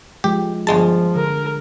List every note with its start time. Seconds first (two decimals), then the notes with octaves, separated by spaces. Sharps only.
0.24 F3 G#3 G4
0.67 G1 F3 G#3 G#4 A5
1.16 D3 A#4